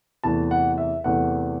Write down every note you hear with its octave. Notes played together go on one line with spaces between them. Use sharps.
E2 C3 E3 A3 A5
F#5
E5
E2 C3 E3 A3 F#5